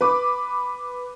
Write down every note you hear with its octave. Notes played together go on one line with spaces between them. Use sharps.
B4 D6